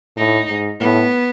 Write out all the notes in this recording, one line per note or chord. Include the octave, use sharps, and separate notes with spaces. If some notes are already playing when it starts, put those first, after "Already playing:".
A2 D#4
G#2
A2 B3